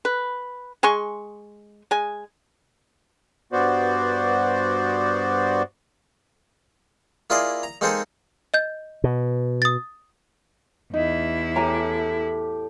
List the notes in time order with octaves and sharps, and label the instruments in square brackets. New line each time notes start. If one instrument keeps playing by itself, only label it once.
[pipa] B4
G#3 G#5 C6 C#6
G#3 G#5
[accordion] G2 B3 F#4 C5 D5
[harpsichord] A#3 E4 F4 G#4 D5 D#5
A#5
G#3 A#3 C4 D#4 G#4 A4
[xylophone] D#5 G6
[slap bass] B2
[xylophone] D#6 A6
[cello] E2 E4 [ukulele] D#4
[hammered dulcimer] A2 G4 [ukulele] G#5 A#5